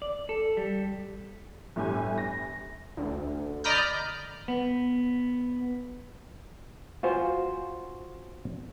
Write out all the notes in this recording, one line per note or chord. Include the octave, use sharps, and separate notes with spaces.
D5
A4
G3
G1 A2 G4 G#5
A#6
D2
D5 D#5 A#5 B5 F6 G6
B3
F4 F#4 C5 G#5